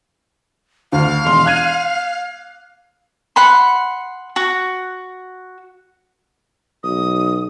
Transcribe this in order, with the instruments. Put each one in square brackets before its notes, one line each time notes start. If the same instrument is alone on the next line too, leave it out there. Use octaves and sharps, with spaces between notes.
[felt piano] D2 [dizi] F5
[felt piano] E1 C6
F#6 G#6 D#7
[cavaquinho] F#5 B5 C6
F#4
[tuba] B1 [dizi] D#6